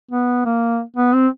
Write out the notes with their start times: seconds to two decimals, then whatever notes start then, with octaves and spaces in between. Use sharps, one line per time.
0.11 B3
0.45 A#3
0.96 B3
1.14 C4